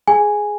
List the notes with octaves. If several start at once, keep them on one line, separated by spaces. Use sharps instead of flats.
G#4 G#5